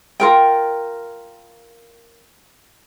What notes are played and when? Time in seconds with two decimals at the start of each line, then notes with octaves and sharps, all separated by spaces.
0.20 F4 A#4 G5